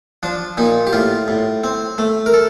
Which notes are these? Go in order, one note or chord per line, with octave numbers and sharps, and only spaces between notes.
F3 D4
A#2 D#4
G4
A2 F4
A2
C4
A3
A#4
A4